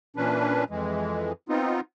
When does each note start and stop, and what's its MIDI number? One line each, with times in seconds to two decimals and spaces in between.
0.16 0.64 46
0.16 0.64 52
0.16 0.64 61
0.16 0.64 62
0.16 0.64 71
0.70 1.32 41
0.70 1.32 52
0.70 1.32 56
1.49 1.81 59
1.49 1.81 60
1.49 1.81 63
1.49 1.81 65